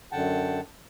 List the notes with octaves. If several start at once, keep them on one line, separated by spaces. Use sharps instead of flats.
F#2 D3 F#5 G5 A5